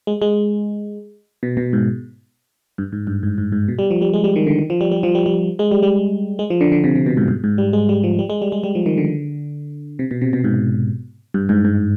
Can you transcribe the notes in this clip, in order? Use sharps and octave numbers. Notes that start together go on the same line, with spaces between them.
G#3
G#3
B2
B2
G#2
G2
G#2
G2
G#2
G#2
G#2
B2
G3
F3
G3
G#3
G3
D#3
D3
D#3
F3
G3
G3
F3
G3
G3
G#3
G3
G3
G#3
F3
D3
D3
C3
C3
B2
G#2
G2
G#2
G3
G#3
G3
F3
G3
G#3
G3
G#3
G3
F3
D#3
D3
C3
B2
C3
B2
G#2
G2
G#2
G#2